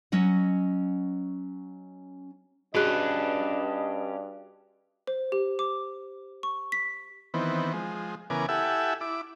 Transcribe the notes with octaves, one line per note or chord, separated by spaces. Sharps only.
F#3 C#4 D#5 F#5
G2 C#4 D4 F#4 G#4 B4 D#5 F#6
C5
G4
D6
C#6
B6
D#3 E3 B3 C4
F3 G#3
C#3 E3 B3 A#4 G#5 D6
E4 G4 A4 E5 F#5 G#5
E4 D6